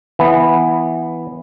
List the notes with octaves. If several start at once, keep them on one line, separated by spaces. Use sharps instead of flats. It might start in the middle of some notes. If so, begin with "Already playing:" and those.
E3 B3